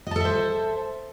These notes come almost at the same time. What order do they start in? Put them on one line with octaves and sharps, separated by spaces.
D#5 A5 A4 E5 C5